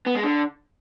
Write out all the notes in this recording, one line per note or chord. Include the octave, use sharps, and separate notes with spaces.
B3
G#3
D3